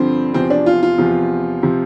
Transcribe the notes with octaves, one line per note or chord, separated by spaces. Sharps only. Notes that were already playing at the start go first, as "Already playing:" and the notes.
Already playing: G2 D3 F3 C4
E2 C3 F3 C4
D4
F4
F4
E2 C3 F3
C3 F3